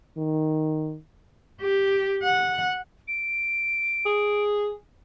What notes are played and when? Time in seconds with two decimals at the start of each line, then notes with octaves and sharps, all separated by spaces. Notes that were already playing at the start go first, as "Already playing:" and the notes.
0.18 D#3
1.61 G4
2.23 F#5
3.08 D7
4.06 G#4